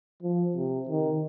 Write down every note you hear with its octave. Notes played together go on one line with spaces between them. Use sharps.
F3
C3
D#3